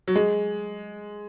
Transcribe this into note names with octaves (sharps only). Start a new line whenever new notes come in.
F#3
G#3